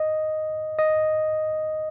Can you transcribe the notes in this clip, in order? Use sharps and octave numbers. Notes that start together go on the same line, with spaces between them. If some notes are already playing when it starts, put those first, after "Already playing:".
Already playing: D#5
D#5